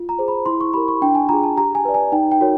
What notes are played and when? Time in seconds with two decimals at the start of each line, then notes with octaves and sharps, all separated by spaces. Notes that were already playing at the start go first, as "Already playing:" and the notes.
Already playing: F4
0.09 A#5
0.19 G#4 C5
0.28 B5
0.46 E4 C6
0.61 C#6
0.74 G4 A#4 B5
0.88 C#6
1.02 D4 G5
1.15 G#5
1.29 F4 A#5
1.33 G#4
1.44 A5
1.57 G4 A#5
1.75 G#5
1.85 B4 D5
1.94 G#5
2.12 D#4 G5
2.32 G5
2.41 F#4 A#4 C#5